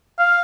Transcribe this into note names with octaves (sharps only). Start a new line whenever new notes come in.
F5